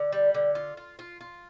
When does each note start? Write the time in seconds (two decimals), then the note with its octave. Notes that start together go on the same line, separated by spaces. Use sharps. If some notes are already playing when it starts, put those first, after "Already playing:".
Already playing: D3
0.12 G3
0.34 D3
0.55 F4
0.77 F4
0.99 F4
1.21 F4